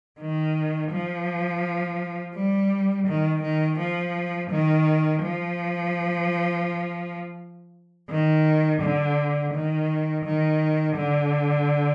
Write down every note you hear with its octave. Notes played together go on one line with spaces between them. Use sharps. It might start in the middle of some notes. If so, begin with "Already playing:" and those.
D#3
F3
G3
D#3
D#3
F3
D#3
F3
D#3
D3
D#3
D#3
D3